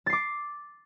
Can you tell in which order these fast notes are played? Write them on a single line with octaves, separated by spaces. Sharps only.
A6 C7 D6